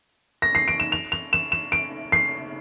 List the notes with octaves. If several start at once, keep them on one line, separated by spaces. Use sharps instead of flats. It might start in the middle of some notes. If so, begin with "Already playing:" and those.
A#6
C7
D7
E7
F7
F7
E7
E7
D7
C7